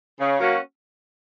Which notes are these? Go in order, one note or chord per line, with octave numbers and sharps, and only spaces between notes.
C#3
F#3 A#3 C#4 F#4